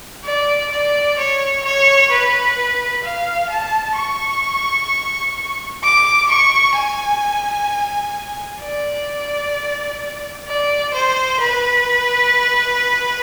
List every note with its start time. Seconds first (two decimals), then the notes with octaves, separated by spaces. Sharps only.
0.24 D5
0.71 D5
1.18 C#5
1.64 C#5
2.11 B4
3.04 F5
3.50 A5
3.96 C#6
5.83 D6
6.30 C#6
6.76 G#5
8.61 D5
10.48 D5
10.94 C5
11.40 B4